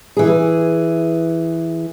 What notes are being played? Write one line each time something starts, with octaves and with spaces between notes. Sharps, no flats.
E3 G#4